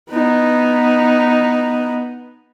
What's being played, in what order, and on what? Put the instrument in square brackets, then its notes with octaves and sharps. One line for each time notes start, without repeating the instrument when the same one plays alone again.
[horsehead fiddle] B3 D#4